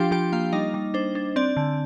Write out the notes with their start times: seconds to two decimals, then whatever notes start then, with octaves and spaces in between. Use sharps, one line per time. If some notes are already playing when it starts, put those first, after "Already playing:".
Already playing: F3 D4 F4 G4 F5 G5
0.11 F3 G4 G5
0.32 A#3 F4 F5
0.53 G3 D#4 D#5
0.74 G3
0.94 D4 C5
1.15 D4
1.36 C4 D5
1.57 D3